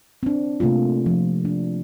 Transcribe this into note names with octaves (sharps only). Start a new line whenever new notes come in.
C4 D4
C3 A3 A#3 F4
F3
D4